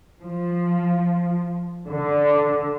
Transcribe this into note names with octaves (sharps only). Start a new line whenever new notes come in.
F3
D3